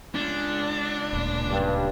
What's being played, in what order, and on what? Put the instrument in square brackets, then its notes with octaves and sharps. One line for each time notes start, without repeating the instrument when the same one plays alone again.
[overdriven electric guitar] C#2 G#3 [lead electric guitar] D4
[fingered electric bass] D1 A#2
[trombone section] G2